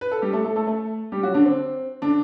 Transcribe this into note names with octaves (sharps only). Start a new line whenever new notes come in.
B4
A4
G3 G4
A3 A4
A3 A4
A3 A4
A3 A4
G3 G4
F#3 F#4
D3 D4
C4
D3 D4